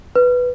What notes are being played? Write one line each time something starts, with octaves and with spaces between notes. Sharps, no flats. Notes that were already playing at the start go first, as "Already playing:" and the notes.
B4